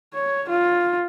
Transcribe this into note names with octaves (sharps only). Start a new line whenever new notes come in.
C#5
F4